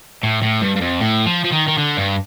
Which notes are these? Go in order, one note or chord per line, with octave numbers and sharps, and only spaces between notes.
A2
A2
G2
G2
F2
A2
F3
F3
D#3
D#3
D3
G2